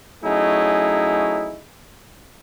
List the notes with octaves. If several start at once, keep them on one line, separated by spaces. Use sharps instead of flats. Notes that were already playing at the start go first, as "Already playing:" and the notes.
F#3 A3 C#4 D#4 E4 G#4